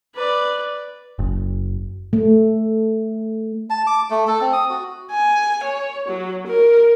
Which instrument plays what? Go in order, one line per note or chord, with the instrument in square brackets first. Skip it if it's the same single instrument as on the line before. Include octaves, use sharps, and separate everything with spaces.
[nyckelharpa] B4 D5
[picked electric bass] F#1
[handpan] A3
[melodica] A5
D6
A3
A4
C4
D#6
F#4
[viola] G#5
C#5
F#3
A#4